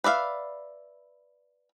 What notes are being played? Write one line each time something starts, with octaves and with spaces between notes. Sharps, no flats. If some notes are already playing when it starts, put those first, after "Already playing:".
B4 D5 E5 F5